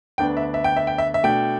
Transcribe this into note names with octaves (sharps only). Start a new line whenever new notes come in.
D2 D3 B3 D4 G5
E5
E5
G5
E5
G5
E5
E5
B2 A3 D4 G5